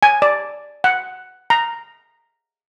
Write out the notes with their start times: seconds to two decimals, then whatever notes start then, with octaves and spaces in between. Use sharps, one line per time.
0.03 G#5
0.22 D5
0.84 F#5
1.50 A#5